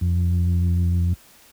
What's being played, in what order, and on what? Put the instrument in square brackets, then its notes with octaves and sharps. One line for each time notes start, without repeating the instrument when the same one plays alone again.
[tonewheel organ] F2